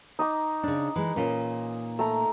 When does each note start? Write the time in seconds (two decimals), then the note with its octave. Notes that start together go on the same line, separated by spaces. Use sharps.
0.19 D#4 D#5 D6
0.63 C#3 D4
0.96 E3 G#3
1.16 A#2 C#4 F4
1.99 A3 A#5